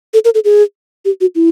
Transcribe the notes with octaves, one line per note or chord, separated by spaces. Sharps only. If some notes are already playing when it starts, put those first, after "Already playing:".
A4
A#4
A4
G#4
G4
F#4
E4